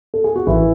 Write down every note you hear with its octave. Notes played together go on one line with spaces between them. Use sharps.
A4
G#4
F#4
A1 E3 E4